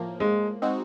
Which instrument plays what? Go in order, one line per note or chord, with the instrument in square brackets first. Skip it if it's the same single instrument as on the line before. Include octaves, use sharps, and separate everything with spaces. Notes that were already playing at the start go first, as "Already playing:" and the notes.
Already playing: [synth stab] A2 F3 A#3
[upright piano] G#3
[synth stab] G#3 C4 D#4 F#4